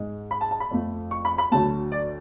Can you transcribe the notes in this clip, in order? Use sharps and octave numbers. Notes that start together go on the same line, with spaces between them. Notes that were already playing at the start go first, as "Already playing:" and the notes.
Already playing: G#2 G#3
B5
A5
A5
B5
F2 F3 A3
C#6
B5
B5
D2 D3 F#3 A3 A5
D5